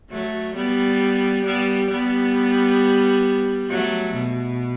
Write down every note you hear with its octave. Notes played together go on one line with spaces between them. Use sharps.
F#3 A3
G3 B3
G3 B3
G3 B3
F#3 A3
B2